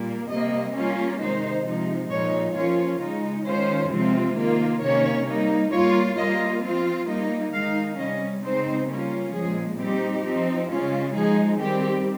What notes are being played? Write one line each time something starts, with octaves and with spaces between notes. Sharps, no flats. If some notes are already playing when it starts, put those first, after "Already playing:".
Already playing: A#2 G3 A#3
C3 G3 A#3 D#5
G3 A#3 C#4 F4
C3 D#3 G#3 D#4 C5
C3 F3 G#3 D#4
A#2 F3 G#3 D#4 C#5
F3 A#3 C#4 F4 C#5
C#3 G#3 D#4
D#3 G#3 C#4 F4 C5
C3 F3 G#3 C4 F4
D#3 A#3 F4
C3 D#3 A#3 C#4 C#5
G3 A#3 D#4
G3 A#3 F4 C#5
G3 A#3 F4 D#5
F3 C4 F4
G3 A#3 D#4 D#5
D#3 G#3 D#4 F5
C3 G3 C#4 D#5
C#3 G#3 C4 D#4 C5
G3 A#3 C#4 F4
A#2 F3 G#3 G#4
G3 C4 D#4 G4
F3 C4 D#4
C#3 G#3 C#4 F4
F3 G#3 D#4 G#4
D#3 G3 C4 G4